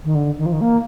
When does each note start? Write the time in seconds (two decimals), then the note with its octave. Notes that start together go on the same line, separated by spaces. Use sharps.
0.04 D#3
0.15 D3
0.38 D#3
0.46 F3
0.52 D#3
0.61 A#3